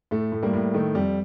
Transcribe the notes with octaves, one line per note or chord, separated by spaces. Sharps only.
A2 A3
A2
G3 A#3
A2
D#3 A3
F2 G3